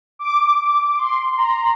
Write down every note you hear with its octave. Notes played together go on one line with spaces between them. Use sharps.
D6
C6
A#5